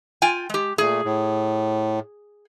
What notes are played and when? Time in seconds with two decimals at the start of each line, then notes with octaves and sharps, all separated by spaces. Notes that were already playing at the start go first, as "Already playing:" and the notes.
0.22 F4 G5 G#5
0.50 G#3 G4
0.78 A#2 A3 G#4
1.04 A2